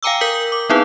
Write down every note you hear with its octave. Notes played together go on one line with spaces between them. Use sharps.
F5 G5 G#5 A#5 D6 E6
A#4 G6 B6 F#7
D6
B3 C4 D#4 E4 G#4 B4